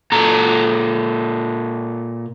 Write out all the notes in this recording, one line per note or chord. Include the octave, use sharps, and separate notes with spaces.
A#2 A4 A#5